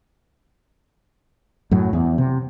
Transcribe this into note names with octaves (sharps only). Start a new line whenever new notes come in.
F#2 A2 F#3
E2
C3